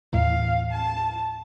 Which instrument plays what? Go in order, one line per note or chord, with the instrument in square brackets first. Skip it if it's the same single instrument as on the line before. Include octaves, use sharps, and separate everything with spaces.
[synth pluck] D#2 A2 E3 [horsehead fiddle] F5
[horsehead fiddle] A5